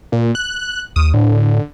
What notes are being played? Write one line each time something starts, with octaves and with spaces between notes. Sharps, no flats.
A#2
F#6
D#2 D#6
A2 D3